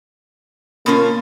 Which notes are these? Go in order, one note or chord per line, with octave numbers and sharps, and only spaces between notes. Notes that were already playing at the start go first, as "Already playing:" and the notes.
B2 A#3 C#4 F4